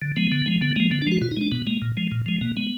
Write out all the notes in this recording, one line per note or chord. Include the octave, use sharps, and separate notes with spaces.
D3
F3 G#3 B3
D3
F3 G#3
D3 B3
F3 G#3 A#3
D3 B3
D4
F3 G#3 F#4
B2 F4
D#4
G#3 D4
B2 B3
G#3 A#3
A#2
F3 G#3
A#2
F3 G#3
B2 A#3
G#3 B3